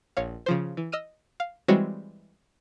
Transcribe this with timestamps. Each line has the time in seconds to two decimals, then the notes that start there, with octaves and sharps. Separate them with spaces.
0.17 A#1 C#5 F5
0.46 C#3 F3 C5
0.77 E3
0.92 D#5 E6 F6 D#7
1.40 F5
1.68 E3 G3 G#3 C4 F#4 C#5